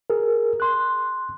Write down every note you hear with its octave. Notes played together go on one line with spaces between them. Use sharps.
G#4 A#4
C6 F#6